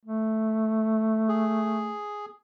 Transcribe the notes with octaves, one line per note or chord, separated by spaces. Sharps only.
A3
G#4